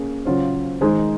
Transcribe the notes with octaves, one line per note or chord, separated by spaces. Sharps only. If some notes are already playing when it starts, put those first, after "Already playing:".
Already playing: A#3 C#4 G#4
C#3 F#3 C#4 F4 C5
D#3 G#3 D#4 G#4 C5